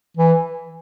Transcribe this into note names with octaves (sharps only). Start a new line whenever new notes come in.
E3